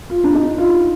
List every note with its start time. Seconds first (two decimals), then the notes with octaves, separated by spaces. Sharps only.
0.10 F4
0.24 D4
0.35 D#4
0.58 F4